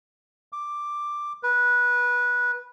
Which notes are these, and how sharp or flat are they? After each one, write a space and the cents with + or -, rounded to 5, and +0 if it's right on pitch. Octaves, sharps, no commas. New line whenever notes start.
D6 +5
B4 -15